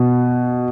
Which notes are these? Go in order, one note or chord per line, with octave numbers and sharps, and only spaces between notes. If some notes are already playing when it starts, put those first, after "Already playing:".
Already playing: B2